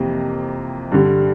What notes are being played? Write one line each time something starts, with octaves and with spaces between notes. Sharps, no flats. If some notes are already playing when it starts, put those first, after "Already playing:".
Already playing: F2 C3 E3 A#3
G2 D3 G3